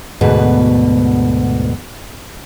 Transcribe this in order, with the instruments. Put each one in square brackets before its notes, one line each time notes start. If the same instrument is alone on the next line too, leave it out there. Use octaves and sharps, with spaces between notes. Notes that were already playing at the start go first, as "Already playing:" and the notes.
[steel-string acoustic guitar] D2 G#2 B2 B4